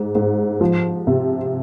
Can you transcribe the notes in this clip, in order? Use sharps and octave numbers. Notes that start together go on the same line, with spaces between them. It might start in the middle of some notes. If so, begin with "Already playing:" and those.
Already playing: G#2
G#2
F3
C3